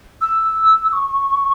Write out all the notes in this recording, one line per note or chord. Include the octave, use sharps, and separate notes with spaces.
E6
C#6